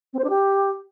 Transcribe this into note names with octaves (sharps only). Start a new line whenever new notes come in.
C4
C5
D4
G4